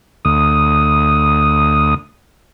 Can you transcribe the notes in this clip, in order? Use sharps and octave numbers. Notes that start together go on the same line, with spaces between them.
D2 D#6